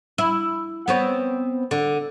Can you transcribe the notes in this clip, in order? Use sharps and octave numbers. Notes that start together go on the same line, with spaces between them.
E4
B3 C4 C#5
D3